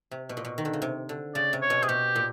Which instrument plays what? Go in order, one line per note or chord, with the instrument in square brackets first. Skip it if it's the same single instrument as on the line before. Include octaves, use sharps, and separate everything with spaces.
[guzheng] C3
B2
A#2
B2
D#3
D3
C#3
C3
D3
[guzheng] C#3 [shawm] D5
[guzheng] C3
[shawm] C#5
[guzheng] B2
[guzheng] C3 [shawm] G#4
[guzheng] B2 [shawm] G4
[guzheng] A#2